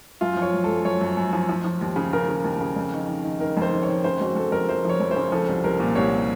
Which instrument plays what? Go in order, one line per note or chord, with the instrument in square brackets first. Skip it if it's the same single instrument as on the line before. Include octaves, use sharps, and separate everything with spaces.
[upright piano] F#2 F4
F3
C#5
F#2
F#2 A4
F#2 C#5
F#2
F#2
F3
F3
F3
D#2
C#3
C#3 A#4
C#3
D#2
C#3
F2
D#3
D#3
D#3
D#3 A#4
F2
C5
D#3
C#5
D#3
C#3 C5
F2 F#4
F2 A4
F2 A#4
F3 C5
F3 C#5
F2
C5
C#3
F3 A4
C2
C2 A#4
A#2
C2 C#5